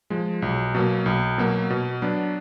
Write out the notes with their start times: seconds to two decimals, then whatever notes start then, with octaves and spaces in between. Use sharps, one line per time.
0.10 F3 G#3
0.42 B1
0.75 B2 F#3 A#3
1.06 B1
1.38 B2 F#3 A#3
1.70 B2
2.02 F#3 B3 D4